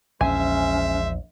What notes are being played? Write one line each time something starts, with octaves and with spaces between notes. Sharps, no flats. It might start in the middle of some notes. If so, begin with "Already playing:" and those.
A#1 E2 G#3 C#4 C5 E5 G#5